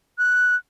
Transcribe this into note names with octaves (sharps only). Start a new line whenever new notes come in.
F#6